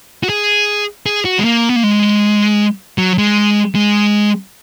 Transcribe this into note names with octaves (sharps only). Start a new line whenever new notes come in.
F#4
G#4
G#4
F#4
G#3
A#3
B3
A#3
G#3
F#3
G#3
G#3